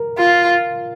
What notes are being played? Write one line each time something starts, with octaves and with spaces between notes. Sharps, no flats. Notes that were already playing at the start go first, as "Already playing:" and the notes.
Already playing: A#4
F4